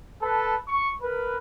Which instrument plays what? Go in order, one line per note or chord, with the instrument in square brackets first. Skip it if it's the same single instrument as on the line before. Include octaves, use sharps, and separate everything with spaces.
[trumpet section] A4 B4 A5
C#6
A#4 B4